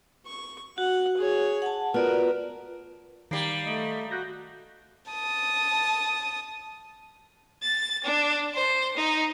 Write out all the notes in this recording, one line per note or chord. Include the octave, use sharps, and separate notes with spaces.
C#6
F#4 F#5
G#4 C#5
F#5 A5
B3 F4 F#4 A#4 D5
D#3 G3 A#3 C7
A3 D#5
F#4 F#6 G6 A#6
A5 D#6
A6
D4
C5
D#4